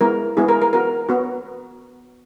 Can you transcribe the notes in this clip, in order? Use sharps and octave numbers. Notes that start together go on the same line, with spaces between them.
G#3 B3 E4 A#4
G#3 B3 E4 G#4
A#4
A#4
B3 F#4 A#4
B3 F#4